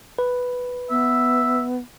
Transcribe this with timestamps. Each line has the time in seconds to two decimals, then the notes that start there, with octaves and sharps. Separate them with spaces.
0.19 B4
0.90 B3 E5